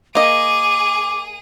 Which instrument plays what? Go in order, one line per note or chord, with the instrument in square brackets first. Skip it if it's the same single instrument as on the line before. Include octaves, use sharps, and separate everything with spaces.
[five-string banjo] A#3 D#5 [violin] G#4 D#7 [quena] D6